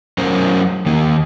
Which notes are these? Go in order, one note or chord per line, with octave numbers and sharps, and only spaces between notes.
F#3 C#4 A#4 C5
D#3 A#3